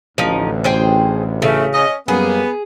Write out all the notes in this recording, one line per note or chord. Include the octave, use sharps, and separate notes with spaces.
A1 D2 F3 D#4
G#4 C5 G5
C#3 A3
C#4 D#5
F#2 G3 A#3 B3 G#4